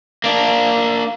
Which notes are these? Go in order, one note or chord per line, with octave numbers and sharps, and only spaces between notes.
A#3 D4